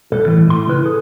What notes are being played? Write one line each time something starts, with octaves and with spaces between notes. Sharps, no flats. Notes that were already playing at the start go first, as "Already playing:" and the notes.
C2 A4
A2 E3
A2 C6
C#3 E4 B4
G#4 A4